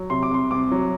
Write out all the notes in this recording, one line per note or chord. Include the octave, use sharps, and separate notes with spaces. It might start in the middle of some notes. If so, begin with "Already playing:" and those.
Already playing: F#3
C3 C6
D6
C2 C6
C2 D6
F#3